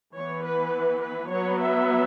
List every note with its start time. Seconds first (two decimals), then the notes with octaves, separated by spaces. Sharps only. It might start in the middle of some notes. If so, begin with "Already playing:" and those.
0.14 E3 B3 C#5
0.44 B4
1.02 B4
1.30 F#3 B3 C#5
1.60 E5